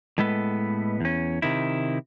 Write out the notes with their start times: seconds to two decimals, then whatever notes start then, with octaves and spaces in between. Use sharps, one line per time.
0.18 A2 G#3 B3 A4 B4
1.01 E2 C#4
1.42 C3 D#3 E4